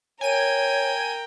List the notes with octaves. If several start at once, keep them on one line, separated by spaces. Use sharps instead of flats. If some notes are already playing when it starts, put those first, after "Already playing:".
A#4 C#5 G5 G#5 D#7